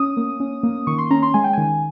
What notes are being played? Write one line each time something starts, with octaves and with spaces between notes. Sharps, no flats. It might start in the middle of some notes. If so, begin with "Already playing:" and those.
Already playing: C#4 D#6
A#3
C#4
A#3
D#3 C#6
C6
C#4 A#5
C6
G#3 G#5
G5
D#3 G#5